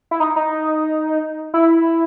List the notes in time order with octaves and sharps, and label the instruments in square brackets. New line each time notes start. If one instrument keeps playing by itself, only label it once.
[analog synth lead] E4
D#4
D#4
E4